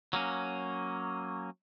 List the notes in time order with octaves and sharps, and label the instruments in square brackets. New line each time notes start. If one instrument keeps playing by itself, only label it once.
[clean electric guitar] F#3 A#3 C#4